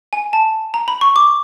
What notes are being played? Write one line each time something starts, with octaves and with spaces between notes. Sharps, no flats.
G#5
A5
A#5
B5
C#6
D6